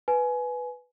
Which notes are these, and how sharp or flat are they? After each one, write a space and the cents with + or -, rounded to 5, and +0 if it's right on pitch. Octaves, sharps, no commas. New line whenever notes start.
B4 +0 G#5 +20